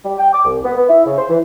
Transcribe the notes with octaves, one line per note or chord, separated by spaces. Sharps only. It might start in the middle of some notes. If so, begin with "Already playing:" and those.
G3
G5
D6
C2
B3
B3
E4
C#3
C5
E3